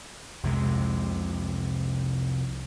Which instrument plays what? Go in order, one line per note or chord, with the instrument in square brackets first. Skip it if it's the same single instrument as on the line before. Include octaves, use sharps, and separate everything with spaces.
[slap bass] C2 F2 C3 G#3